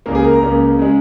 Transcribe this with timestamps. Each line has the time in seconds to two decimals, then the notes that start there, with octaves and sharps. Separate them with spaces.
0.06 C#2 C#3 A#3 A#4
0.15 G#4
0.25 A#4
0.33 A#5
0.42 C#2 C#3 A#3
0.79 C#3 G#3